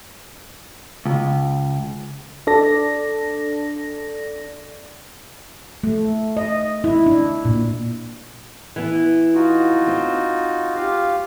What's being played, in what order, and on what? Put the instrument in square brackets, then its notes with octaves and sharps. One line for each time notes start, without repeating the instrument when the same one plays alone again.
[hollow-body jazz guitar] C#2
[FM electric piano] D4 A4 D5 A#6
[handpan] A3
D#5
E4
D4
A#2
[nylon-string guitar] E3 B3
[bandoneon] D#4 F4 F#4
[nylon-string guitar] C4
[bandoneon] F4 G4 F5